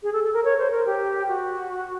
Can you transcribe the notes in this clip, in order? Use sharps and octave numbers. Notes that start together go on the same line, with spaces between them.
G#4
A4
A4
A#4
C#5
C5
A#4
G4
F#4